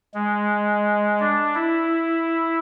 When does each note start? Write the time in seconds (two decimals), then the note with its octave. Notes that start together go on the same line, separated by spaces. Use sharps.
0.14 G#3
1.20 D4
1.55 E4